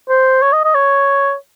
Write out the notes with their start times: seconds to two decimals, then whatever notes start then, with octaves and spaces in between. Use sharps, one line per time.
0.09 C5
0.42 C#5
0.53 D#5
0.64 D#5
0.74 C#5